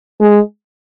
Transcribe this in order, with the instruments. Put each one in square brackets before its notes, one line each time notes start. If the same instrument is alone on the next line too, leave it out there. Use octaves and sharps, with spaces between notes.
[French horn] G#3